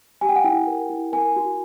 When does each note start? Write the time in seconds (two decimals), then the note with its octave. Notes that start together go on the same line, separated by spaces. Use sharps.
0.21 G4 G#5
0.29 G5
0.36 F#5
0.44 E4 G5
0.67 A#4
0.90 E4
1.12 A#4 G#5
1.36 F#4